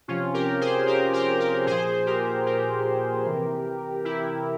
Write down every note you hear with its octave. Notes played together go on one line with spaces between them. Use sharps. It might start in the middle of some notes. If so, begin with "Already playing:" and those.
C3 F3 C#4 F4
G4 A#4
G#4 C5
G4 A#4
G4 A#4
G4 A#4
A#2 F3 G#4 C5
G4 A#4
G4 A#4
C3 E3
E4 G4